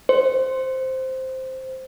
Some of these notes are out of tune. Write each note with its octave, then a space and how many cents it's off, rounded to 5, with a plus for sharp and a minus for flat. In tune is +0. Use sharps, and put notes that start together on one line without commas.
C5 +0